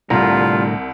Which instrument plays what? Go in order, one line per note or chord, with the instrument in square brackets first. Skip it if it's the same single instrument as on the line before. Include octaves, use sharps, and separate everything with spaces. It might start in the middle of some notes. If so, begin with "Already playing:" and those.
[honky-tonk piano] C2 [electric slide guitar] A2 D3 A#5 [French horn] G3 [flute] F4